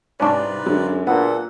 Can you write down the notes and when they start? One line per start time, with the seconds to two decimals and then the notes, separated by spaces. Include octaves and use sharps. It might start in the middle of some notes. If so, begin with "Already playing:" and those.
0.20 C2 G#2 C#4 D4 F4 B4 D5
0.66 F#2 D3 F#3 G#3
1.07 A#2 B3 A4 F#5